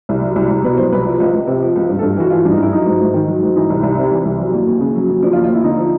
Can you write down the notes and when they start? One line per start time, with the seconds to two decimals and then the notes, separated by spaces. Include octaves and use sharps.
0.09 C2
0.22 F#3
0.36 C2
0.50 C2
0.64 B2 B4
0.77 F#3 C5
0.92 C2 B4
1.05 F3
1.20 C#2
1.33 C#2
1.47 C3
1.62 F3
1.76 C#2
1.89 G2
1.99 A4
2.03 G2
2.16 E3 F#4
2.30 E3 F4
2.45 G2 D4
2.51 D#4
2.59 G2 E4
2.72 F#3 D#4
2.86 G#2
3.00 G#2
3.14 D#3
3.28 F#3
3.43 G#2
3.56 E3 D#4
3.70 C2
3.83 C2
3.98 C3
4.11 E3
4.25 C2
4.39 F#3
4.53 D#2
4.66 D#2
4.80 C#3
4.95 F#3
5.09 D#2
5.22 F3 D4
5.33 F4
5.36 D#2
5.44 F4
5.50 D#2 E4
5.64 D3 D#4
5.78 F3